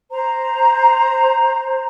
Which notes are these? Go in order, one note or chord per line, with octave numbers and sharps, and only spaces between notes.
C5 A#5